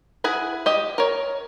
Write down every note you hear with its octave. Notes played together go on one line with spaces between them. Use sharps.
E4 G#4 F#5 G#5
G4 D#5
A#4 C#5